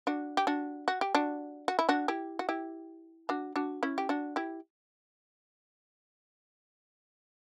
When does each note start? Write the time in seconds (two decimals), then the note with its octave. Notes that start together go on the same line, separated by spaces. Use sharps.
0.07 D4 F#4
0.37 G4
0.47 D4 F#4
0.88 F#4
1.01 G4
1.15 D4 F#4
1.68 F#4
1.79 E4
1.89 D4 F#4
2.08 E4 G4
2.39 F#4
2.49 E4 G4
3.29 D4 F#4
3.56 D4 F#4
3.83 C#4 E4
3.98 G4
4.09 D4 F#4
4.36 E4 G4